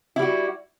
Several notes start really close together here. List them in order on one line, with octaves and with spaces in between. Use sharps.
E4 G3 F#4